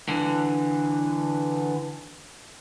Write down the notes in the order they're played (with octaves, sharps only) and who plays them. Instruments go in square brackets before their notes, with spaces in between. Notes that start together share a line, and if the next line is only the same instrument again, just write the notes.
[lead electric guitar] D3 E3